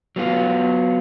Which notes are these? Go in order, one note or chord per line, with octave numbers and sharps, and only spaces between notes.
F#3 B3 F4